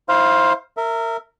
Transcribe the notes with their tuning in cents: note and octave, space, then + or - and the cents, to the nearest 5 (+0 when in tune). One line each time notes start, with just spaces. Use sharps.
E4 -35 C5 +15 F5 +0
A#4 -25 E5 +0